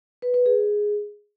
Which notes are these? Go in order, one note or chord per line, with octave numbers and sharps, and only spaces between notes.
B4
B4
G#4